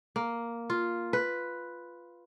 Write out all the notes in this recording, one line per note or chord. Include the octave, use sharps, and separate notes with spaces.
A#3
F4
B4